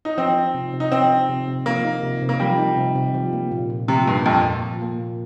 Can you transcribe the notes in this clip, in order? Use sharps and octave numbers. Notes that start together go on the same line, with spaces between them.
D#4
F3 C4
D#4
C3
C3
D#4
F3 C4
D#4
C3
C3
F3 A#3
D#4
C3
C3
A#3
F3 G3
D#4
C3
C3
F3
A#3
A#2
A#2
C3 F3
G2 A#3
F2 A#2
A#2
F3
A#3
A#2